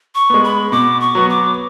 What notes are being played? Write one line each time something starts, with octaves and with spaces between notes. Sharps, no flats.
C#6
G#3 B3
B5
B2 D6
C#6
F#3 B3 F#4
D6